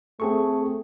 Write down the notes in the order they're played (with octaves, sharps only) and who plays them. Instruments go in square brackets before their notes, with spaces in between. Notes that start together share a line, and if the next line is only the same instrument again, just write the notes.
[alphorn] A3 [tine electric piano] C4 G#4 C#6